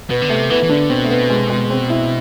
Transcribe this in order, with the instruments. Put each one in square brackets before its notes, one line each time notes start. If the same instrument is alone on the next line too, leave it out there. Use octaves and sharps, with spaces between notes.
[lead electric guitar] B2 [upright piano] B3
[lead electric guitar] D3
[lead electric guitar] C3 [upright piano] A3
[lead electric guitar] E3 [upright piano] B3
[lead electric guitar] E3
[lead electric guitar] D3 [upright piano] D4
[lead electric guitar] B2 [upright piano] C4
[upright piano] A3
B3
G#3
G#3
C4
E4